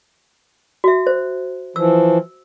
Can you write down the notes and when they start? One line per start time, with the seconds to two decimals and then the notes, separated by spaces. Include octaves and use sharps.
0.84 F#4 E5
1.07 C5
1.76 E3 F3 E6